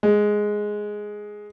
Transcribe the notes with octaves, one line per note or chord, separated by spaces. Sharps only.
G#3